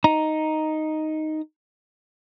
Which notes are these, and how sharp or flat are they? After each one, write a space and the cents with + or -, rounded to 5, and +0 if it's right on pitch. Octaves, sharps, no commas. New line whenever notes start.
D#4 +0 A#5 +0